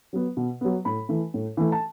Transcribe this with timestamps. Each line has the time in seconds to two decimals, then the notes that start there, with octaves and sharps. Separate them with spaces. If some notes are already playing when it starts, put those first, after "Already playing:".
0.13 F#3 B3
0.37 B2
0.61 F#3 B3
0.85 A2 B5
1.09 E3 A3
1.34 A2
1.57 E3 A3
1.72 A5